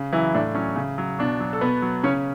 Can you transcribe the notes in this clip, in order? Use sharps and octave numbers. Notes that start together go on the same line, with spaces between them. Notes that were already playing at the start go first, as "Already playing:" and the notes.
Already playing: C#3
E3 F#3 E4
A2 D4
F#3 C#4
C#3
F#3
B2 D4
F#3
A4
B2 B3 B4
F#3
C#3 C#4 C#5